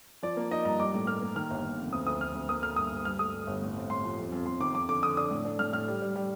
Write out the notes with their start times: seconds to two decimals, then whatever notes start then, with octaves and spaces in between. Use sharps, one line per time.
0.23 F3 D5
0.37 A#3
0.51 D#4 D#5
0.65 G2 A#5
0.80 G3 D6
0.94 A2
1.07 A#3 F6
1.22 A#3
1.36 D#3 F6
1.50 G1
1.64 G1
1.78 F2
1.93 D2 D#6
2.06 D2 D#6
2.20 D2 F6
2.35 D2
2.49 A#3 D#6
2.62 D3 F6
2.76 G2 D#6
2.91 G2
3.05 G2 F6
3.19 A3 D#6
3.33 G2
3.47 G1
3.62 A2
3.76 C4
3.90 A2 C6
4.04 F3
4.18 F2
4.32 F2
4.46 F2 C6
4.60 D#3 D6
4.74 F2 D6
4.89 D3 D6
5.02 D3 D#6
5.17 D4 D#6
5.31 A2
5.45 D4
5.59 A2 F6
5.73 A2 F6
5.88 G3
6.02 G3
6.15 G3